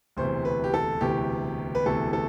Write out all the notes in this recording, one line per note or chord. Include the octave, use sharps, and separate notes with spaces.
E1 D2 C3 E3 C5
B4
G4
A4
E1 D2 C3 E3 G4
B4
E1 D2 C3 E3 A4
A4